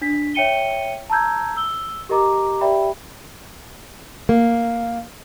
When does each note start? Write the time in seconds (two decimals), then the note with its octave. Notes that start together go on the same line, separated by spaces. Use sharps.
0.02 D4 B6
0.34 C#5 E5 G5 C#7 D#7 G7
1.10 A5 A#5 E6 G6 G#6
1.57 E6 G7
2.09 G4 A#4 D#5 A#5 D6
2.61 G4 D5 E5 G5 B5
4.29 A#3